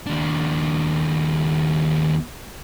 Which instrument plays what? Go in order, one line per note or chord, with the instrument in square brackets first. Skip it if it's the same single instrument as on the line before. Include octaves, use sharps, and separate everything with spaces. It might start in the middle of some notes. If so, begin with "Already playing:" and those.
[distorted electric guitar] D#2 D4